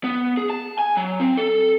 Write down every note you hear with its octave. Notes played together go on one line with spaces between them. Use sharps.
B3
G#4
A5
G#5
F#3
C4
A4